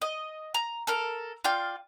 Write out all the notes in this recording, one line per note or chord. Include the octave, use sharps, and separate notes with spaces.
D#5
A#5
A4 A#4 F6
F4 D5 F5 G5